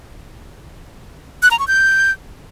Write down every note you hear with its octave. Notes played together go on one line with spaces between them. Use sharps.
F#6
A#5
C#6
G6